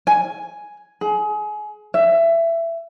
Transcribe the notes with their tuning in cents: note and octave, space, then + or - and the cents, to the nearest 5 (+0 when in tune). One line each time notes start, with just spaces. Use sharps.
G#5 +5
G#4 +25
E5 +20